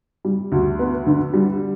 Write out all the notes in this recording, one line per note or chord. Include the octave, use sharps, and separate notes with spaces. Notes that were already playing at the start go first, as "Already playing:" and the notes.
G3
D2
B3
D3
G3